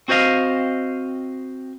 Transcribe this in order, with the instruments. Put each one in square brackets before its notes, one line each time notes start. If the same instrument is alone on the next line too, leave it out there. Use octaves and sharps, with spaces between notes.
[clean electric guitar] C4 F#4 C5 D#5 F5